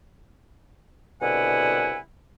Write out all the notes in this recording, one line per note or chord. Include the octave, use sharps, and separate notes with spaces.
C2 B2 D3 E4 F#5 G#5